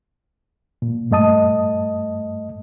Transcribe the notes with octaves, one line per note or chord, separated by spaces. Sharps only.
A#2
G2 A3 D#5 A5 D#6